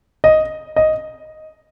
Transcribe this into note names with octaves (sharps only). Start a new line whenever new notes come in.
D#5
D#5